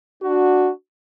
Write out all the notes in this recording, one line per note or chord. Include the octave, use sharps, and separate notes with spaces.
D4 F#4